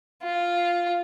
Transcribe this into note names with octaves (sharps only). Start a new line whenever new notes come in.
F4